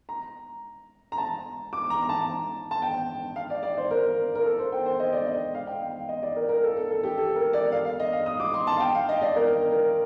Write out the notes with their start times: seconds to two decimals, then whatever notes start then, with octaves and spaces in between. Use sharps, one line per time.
0.09 A#5
1.12 A#5
1.18 A5
1.73 D6
1.90 A#5
2.02 A#5
2.09 A5
2.71 A5
2.82 G5
3.36 F5
3.50 D5
3.63 D5
3.77 C5
3.91 A#4
4.35 A#4
4.45 A4
4.58 C5
4.72 G5
4.86 C5
5.00 D#5
5.13 D5
5.26 D#5
5.55 F5
5.67 G5
5.81 F5
6.09 D#5
6.23 D5
6.36 A#4
6.49 A#4
6.63 A4
6.77 A4
6.91 A4
7.03 G4
7.18 A4
7.36 A#4
7.53 D5
7.72 F5
7.85 F5
8.00 D#5
8.13 F5
8.26 D#6
8.40 D6
8.54 C6
8.67 A5
8.77 F5
8.80 G5
8.95 F5
9.09 D#5
9.22 D5
9.36 A#4
9.72 A#4